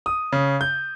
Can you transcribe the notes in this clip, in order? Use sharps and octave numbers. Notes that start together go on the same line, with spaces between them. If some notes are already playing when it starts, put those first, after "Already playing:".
D#6
C#3
G6